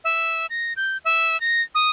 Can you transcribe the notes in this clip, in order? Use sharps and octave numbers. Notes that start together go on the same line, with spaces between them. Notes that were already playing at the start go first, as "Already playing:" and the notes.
E5
A#6
G6
E5
A#6
D#6